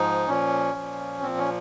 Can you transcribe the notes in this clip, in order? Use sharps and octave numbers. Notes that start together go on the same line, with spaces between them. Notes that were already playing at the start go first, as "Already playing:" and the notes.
Already playing: G#2 F3 D#4
A#2 F3 C#4
A#2 F3
A#2 F3 C4
C#4